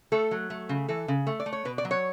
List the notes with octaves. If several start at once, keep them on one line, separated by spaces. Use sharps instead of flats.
A3 A4
F#3
A3
C#3
E3 A4
C#3
A3
D5
A3
C#5
B2 B4
D5
F#3
C#5